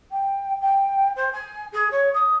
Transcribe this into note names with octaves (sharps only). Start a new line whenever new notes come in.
G5
G5
C5
G#5
G#4
C#5
D#6